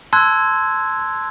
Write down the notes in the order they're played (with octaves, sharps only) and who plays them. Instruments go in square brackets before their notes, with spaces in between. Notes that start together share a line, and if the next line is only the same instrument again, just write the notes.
[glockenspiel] A5 C6 E6 F#6 G#6